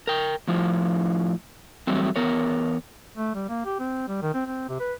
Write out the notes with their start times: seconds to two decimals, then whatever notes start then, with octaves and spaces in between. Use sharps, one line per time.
0.07 A#4 G5
0.48 A2 F3 E4 F4
1.87 E3 F#3 G3 A3 C4
2.16 E2 B3 A#4 C#5
3.17 A3
3.34 G3
3.48 A#3
3.65 G4
3.79 C4
4.08 G3
4.22 D#3
4.34 C4
4.46 C4
4.69 C3
4.80 B4